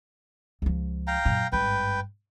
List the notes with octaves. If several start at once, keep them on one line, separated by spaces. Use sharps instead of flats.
C#2 F3
F5 G5 A#5
F#2 A#2
G#1 G2 B4 G5